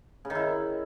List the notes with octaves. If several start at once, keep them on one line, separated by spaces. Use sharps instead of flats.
C#3
D#3
E4